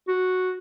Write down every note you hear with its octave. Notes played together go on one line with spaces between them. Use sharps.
F#4